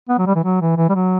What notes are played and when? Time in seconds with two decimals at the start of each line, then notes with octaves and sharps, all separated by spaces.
0.09 B3
0.18 F#3
0.26 G3
0.35 E3
0.44 F#3
0.61 E3
0.77 E3
0.89 G3
0.95 F#3